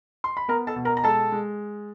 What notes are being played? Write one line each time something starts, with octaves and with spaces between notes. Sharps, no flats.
C6
B5
B3 A#4 A#5
A4 A5
B2
A#4 A#5
A#5
G#3 A4 A5
G#3